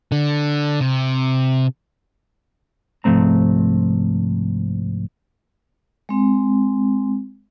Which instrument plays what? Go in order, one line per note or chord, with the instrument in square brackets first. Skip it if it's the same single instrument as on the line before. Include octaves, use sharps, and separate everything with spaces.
[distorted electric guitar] D3
C3
[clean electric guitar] C2 G#2 F3 A3 C4 A#5
[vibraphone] G#3 C4